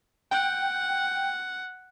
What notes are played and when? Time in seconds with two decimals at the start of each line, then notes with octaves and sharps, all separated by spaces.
0.31 F#5 G5